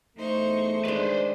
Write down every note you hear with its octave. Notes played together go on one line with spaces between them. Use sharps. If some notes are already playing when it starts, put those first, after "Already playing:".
E2 A3 D#4 C5 C#6
D#3 G#3 D4 B4 C5